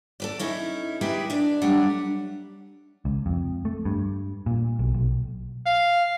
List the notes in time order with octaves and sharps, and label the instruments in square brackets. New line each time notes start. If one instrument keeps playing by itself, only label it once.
[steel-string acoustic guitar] A4 B4 D5
C#4 D#4 E4
G#3 E4 G4 A#4 B4 E5
D4 D5
F#3 G3 A3 D4 F#5
[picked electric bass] C#2
F2
A3
G2
A#2
B1
B1
[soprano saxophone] F5